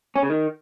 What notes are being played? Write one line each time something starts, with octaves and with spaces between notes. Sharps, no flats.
C#4
C#3
D#3